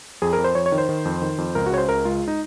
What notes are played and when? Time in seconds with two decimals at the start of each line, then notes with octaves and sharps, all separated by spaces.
0.22 F2 G#4
0.33 A#4
0.38 F2
0.44 C5
0.55 F2 C#5
0.66 C#5
0.72 D#3
0.78 C5
0.89 D#3
1.05 F2
1.22 D#3
1.38 F2
1.55 C#2 A#4
1.66 F#4
1.72 C#3 C#5
1.78 C5
1.89 C#2 A#4
2.05 G#3 F4
2.28 D#4